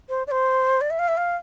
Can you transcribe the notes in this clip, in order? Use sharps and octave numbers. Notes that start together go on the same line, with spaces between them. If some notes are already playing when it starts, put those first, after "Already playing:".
C5
D5
C5
D5
E5
F5
E5
F5